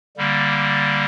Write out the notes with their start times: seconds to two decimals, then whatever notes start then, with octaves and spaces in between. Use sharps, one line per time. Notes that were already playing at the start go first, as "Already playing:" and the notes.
0.17 D3 G3 A#3